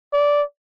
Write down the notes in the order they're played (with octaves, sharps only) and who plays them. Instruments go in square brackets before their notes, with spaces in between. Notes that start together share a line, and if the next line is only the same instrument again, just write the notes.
[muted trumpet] D5